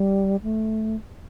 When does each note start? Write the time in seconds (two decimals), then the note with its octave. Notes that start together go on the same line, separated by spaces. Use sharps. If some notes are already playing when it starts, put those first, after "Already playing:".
Already playing: G3
0.43 A3